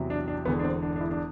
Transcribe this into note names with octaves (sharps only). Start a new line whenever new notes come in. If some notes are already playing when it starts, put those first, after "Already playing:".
Already playing: E2 C3 F#3
D4
D4
E1 E2 D3 B3
D4
C4
D4
D4
E4
D4